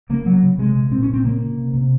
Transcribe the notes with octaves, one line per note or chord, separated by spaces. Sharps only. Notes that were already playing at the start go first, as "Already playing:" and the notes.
C#3 A#3
C#3 F#3
C#3
C3 G#3
C3
A#2 C4
C#4
A#2
C4
C#3 A#3
C#3
C3
C3